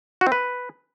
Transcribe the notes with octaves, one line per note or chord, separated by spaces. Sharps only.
F#4
C4
B4